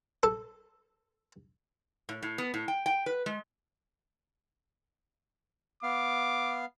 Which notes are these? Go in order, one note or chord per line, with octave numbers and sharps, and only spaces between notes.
A4
A2
A2
B3
A2
G5
G5
B4
G#3
B3 F5 D6